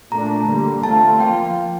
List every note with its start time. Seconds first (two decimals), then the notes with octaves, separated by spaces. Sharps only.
0.12 A#2 A3 D4 A#5
0.48 D3 G3 A#3
0.84 D3 A3 C4 F4 A5
1.20 F3 A#3 F4 G5